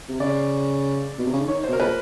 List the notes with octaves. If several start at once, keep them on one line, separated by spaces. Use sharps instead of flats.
C3
C#3 D5
B2
C3
C#3
D3
D#3 C#5
C5
B2 A#4
A#2 B4